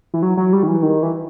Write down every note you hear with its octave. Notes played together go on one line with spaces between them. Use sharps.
E3
F#3
F#3
G3
D#3
E3
D#3
E3